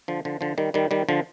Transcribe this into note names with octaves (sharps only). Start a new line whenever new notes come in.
D3 F3
D3 F3
D3 F3
D#3 G3
D#3 G3
D#3 G3
D3 F3